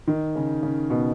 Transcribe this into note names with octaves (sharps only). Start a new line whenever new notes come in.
D#3
C#3
C#3
B2